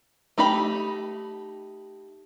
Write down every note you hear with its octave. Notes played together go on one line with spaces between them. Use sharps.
A3 D#4 G4 B5